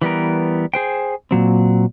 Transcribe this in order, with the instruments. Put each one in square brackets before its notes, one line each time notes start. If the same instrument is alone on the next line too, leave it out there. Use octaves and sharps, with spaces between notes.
[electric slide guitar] E3 G3 B3 A#4
G#4 C5 G5
A#2 F#3 C4